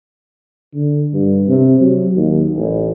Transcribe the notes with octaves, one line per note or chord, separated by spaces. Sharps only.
D3
G2
C3
F#3
D#2
A1